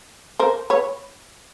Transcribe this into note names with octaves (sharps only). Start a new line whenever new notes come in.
A#4 C5
B4 C#5